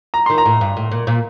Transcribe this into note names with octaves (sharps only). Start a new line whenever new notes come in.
A#5
D#3 C6
A#5
A2
G2
A2
A#2
A#2